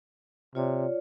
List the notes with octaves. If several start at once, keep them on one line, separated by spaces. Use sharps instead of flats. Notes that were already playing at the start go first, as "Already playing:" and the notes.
C3 F4 C#5 D5